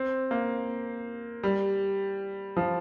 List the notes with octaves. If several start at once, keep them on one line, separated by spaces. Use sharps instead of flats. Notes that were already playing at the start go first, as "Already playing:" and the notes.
Already playing: C4
A#3
G3
F3